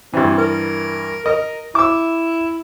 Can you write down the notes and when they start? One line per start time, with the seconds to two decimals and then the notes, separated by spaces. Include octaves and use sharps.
0.13 G2 E3 C4
0.38 A#4
1.26 A#4 D#5
1.75 E4 D6 E6